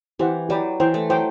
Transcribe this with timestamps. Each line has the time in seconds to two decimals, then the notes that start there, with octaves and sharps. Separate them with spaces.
0.19 E3 G4 C5 F#5
0.49 F#3 G4 D5 G5 B5
0.80 E3 C5 G5 C6
0.94 A3
1.10 F#3 C5 G5 C6